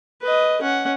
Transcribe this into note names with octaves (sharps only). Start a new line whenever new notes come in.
B4 D#5
C#4 F#5